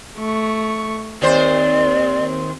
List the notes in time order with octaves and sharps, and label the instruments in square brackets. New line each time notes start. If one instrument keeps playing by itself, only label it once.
[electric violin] A3 C#6
[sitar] D#2 C5 [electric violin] C4 [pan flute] D5